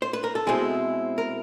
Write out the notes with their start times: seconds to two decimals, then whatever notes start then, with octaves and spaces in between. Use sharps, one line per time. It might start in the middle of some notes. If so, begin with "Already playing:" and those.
0.02 C5
0.13 B4
0.24 A#4
0.35 A4
0.47 B2 G#3 C4 E4 G#4
1.18 A#4